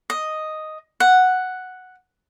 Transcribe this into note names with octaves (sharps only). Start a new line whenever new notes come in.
D#5
F#5